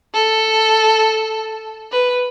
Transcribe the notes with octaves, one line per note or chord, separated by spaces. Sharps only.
A4
B4